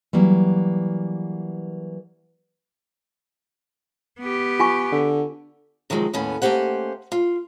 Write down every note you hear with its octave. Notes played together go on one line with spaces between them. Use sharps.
E3 F#3 G3 A#3
B3 G4
F4 G#5 C#6
D3
C3 D#3 F3 F#3 G#3
D#2 A2 B3 C#4
A3 A#3 C#4 G4 C5 F#5
F4